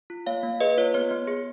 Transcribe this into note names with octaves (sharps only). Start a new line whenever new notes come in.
F4
A#3 C#5 F5
A#3
G#4 B4 D#5
F4 C#5
B3 C#5
B3
G#4